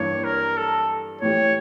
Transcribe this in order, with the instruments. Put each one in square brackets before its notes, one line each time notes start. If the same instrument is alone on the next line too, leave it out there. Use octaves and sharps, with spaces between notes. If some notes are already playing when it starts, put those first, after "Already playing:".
Already playing: [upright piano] G2 E3 A#3 D4 [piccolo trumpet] C#5
[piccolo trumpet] A#4
A4
[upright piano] A2 E3 A3 C#4 G4 [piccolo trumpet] C#5